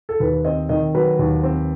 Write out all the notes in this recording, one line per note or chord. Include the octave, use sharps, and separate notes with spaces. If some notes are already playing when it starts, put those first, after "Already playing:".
A4
D#2 B4
C4 D#5
D#3 D#5
F#3 B4
D#2
C4